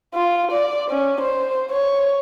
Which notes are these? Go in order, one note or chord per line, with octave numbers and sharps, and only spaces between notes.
F4
D5
C#4
C5
C#5